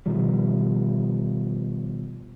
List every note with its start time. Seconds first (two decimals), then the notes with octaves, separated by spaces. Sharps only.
0.06 B2 D#3 F3 G3